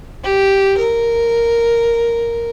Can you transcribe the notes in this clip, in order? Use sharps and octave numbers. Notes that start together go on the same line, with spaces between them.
G4
A#4